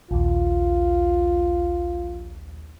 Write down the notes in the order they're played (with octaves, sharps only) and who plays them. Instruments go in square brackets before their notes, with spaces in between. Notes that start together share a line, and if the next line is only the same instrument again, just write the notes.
[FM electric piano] A#1 D#2 [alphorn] F4